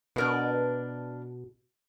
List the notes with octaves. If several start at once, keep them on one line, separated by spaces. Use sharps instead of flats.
B2 D4 A#4 B4